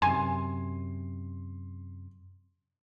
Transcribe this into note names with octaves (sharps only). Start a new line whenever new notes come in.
F#2 C3 G#5 C6